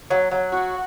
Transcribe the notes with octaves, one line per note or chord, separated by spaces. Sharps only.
F#3
F#3
F#4